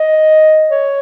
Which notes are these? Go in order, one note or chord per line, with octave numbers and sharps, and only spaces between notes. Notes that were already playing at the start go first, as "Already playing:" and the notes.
Already playing: D#5
C#5